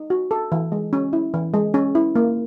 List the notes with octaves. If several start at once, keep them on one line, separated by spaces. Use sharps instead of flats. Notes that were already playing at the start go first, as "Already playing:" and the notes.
Already playing: D#4
F#4
A4
E3
G#3
C#4
E4
E3
G#3
C#4
E4
A#3